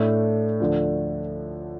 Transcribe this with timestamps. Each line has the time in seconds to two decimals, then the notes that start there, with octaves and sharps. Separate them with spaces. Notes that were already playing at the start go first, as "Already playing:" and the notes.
Already playing: A2 A3 D4
0.60 D2 D3 F3 D4